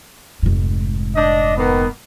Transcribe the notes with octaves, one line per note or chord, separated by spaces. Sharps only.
F1 G#2
D4 D#5
D#3 A#3 B3